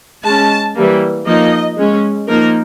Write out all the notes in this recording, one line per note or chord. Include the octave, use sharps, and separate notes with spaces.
G#3 C#4 A5
E3 G3 A#3
F3 A#3 D#4 D#5
G#3 C#4
F3 A#3 D#4 A#4